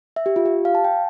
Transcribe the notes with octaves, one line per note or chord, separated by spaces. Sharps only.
E5
G4
F4
G4
F5
A5
G5